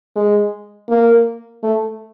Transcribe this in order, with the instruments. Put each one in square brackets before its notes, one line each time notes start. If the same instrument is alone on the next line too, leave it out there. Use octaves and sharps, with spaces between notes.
[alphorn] G#3
A#3
A3